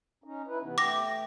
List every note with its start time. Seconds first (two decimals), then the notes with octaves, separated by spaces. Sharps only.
0.24 C#4 D#4
0.47 E4 B4
0.62 C3 E3 B3
0.78 A3 G5 D6 A#6